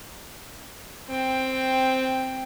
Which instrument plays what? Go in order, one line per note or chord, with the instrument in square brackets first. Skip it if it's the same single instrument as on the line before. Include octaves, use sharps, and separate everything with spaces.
[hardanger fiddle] C4 G5